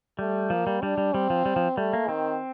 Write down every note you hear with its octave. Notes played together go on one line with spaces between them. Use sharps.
G3 A3
F3 A#3
G3
G3 D4
G3
G3 C4
F3
G3
F3
G3 A3
A#3
D#3 C4